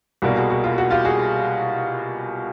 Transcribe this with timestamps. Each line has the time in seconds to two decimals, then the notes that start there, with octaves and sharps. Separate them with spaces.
0.22 C2 B2 G3 A#3 F#4
0.36 F#4 G#4
0.50 F#4
0.64 F4
0.78 F#4
0.90 F4 G4
1.05 F#4 G#4